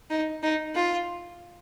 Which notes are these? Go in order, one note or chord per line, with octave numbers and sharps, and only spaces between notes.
D#4
D#4
F4